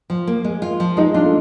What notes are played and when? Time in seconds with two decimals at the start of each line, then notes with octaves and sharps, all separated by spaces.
0.10 F3
0.27 A#3
0.44 G#3
0.62 F4
0.80 F3
0.97 G#3 D#4
1.14 D4 F4
1.25 A3